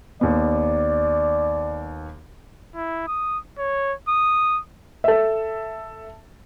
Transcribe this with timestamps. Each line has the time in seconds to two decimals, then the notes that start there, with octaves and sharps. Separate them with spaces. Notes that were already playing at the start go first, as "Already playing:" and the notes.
0.21 D#2 B3 D5
2.76 E4
3.07 D#6
3.59 C#5
4.09 D#6
5.04 A4 E5